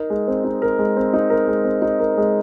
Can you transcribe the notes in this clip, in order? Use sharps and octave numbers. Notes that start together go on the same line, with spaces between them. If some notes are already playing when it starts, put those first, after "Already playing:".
Already playing: D#4 A#4
G#3
C4
D#4
A#4
G#3
C4
D#4
A#4
G#3
C4
D#4
A#4
G#3